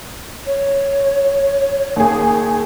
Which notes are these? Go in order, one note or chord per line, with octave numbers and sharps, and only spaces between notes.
C#5
D#2 G#4